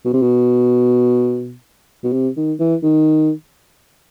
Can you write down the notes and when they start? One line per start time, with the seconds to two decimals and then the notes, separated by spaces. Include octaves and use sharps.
0.05 B2
0.13 C3
0.22 B2
2.04 B2
2.13 C3
2.37 D#3
2.59 E3
2.83 D#3